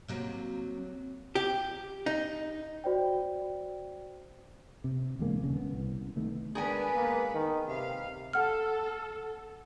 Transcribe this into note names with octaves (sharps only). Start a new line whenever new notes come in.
C3 F#3 A#3
G4
D#4
F#4 C5 D5 G5
C3
E2 D3 G#3 A#3
D#1 C#3
B3
C2
D#3 A3 B3
G#3 B3 D4 G#4 A#4 B4 G#5
A#3
D#3
C3 B4 F5
A4 F#5 F6